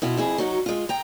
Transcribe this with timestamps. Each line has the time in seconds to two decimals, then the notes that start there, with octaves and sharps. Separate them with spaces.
0.02 B2 E4 F4
0.17 F2 E4 G#4
0.38 F#3 D#4 F#4
0.66 G#3 F4
0.89 G5 A#5